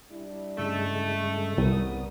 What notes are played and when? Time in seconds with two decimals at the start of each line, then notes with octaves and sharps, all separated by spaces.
0.11 G3 D4 E4
0.58 G2 C#3 G#3 A3
1.58 C2 C3 G3 B3 A#4 D#6